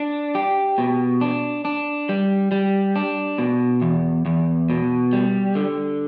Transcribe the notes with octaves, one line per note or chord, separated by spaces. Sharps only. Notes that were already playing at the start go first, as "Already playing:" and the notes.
Already playing: D4
G4
B2
D4
D4
G3
G3
D4
B2
E2
E2
B2
G3
D3